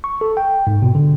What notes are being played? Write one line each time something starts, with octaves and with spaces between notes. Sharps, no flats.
C#6
A4
G5
G#2
B2
D3